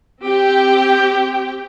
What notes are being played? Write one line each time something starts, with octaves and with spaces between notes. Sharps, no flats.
C4 G4 G5